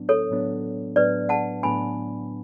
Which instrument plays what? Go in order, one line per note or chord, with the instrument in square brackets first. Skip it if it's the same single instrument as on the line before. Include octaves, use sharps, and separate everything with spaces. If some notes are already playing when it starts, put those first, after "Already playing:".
Already playing: [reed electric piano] A2 F#3 B3 D4
[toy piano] A4 C#5
[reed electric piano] A2 F#3 B3 D4
[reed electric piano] A2 F#3 B3 D4 [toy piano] B4 D5
[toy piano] F#5 A5
[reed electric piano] A2 F#3 B3 D4 [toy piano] G#5 B5